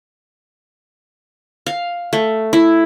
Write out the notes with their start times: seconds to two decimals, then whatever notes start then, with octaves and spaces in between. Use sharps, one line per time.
1.66 F5
2.13 A3
2.53 E4